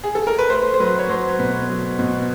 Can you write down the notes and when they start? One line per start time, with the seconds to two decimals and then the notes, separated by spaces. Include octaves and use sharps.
0.04 G#4
0.15 A4
0.27 A#4
0.39 B4
0.50 A3 C5
0.74 C5
0.80 F#3 B4
0.99 C#5
1.09 F#3 C5
1.39 B2 B4
1.69 F#3
1.99 B2